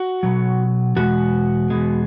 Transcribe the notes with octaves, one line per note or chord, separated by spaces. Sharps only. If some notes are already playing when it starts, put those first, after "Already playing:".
Already playing: F#4
B2 F#3
E2 B2 G#3 F#4
E2 B2 G#3